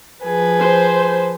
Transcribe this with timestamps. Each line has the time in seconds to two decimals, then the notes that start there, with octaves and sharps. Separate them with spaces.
0.24 F3 G#4 B4
0.60 C5